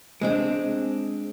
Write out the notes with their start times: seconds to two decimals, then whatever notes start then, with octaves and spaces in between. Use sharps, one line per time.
0.21 G#3 C4 D4